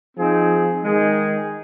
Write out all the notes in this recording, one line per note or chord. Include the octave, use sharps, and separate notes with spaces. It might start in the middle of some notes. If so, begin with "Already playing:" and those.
F3 C4 D#4 G#4
D#3 G#3 D#4 G#4